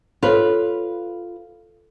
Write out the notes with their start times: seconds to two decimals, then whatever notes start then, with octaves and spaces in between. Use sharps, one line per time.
0.23 F4 A4 B4 C#5